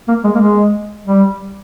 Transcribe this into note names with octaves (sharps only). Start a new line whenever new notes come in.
A#3
G#3
A#3
G#3
G3